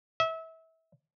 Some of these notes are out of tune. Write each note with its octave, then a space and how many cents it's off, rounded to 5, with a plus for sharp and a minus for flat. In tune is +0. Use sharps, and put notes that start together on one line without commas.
E5 -30